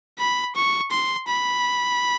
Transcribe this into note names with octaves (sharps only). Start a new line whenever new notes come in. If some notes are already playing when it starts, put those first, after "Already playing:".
B5
C#6
C6
B5